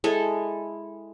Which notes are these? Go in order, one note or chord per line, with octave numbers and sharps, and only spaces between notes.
G#3 E4 A4